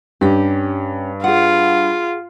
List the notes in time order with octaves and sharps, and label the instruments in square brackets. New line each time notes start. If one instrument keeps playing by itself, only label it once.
[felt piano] G2 [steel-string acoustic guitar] C#4 G4
[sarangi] F4 [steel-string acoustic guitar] G#4 F#5